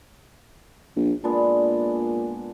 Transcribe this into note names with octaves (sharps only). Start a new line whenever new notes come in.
A#1
A#2 G#3 B3 D4